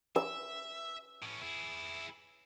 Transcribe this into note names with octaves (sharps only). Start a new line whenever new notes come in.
E5 E6
A2 C#4
E4 G#4